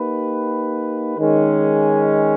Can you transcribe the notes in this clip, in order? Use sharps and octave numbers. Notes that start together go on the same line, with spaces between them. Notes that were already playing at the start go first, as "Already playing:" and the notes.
Already playing: A#3 D#4 G4 B4
D#3 G#3 C#4